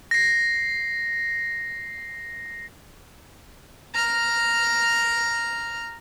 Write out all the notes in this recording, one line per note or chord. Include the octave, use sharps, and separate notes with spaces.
A#6 C7
A#5 F6